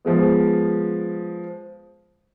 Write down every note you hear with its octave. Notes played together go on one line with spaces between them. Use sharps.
F3 G#3 B3